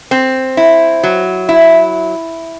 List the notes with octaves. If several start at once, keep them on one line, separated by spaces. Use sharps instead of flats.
C4
E4
F#3
E4